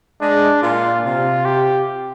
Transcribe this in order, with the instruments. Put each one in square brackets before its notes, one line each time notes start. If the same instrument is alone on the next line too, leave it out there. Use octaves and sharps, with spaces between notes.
[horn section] G#3 [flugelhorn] D4
[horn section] A#2 [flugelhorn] F4
[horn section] C3 [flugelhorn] F4
[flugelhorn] G4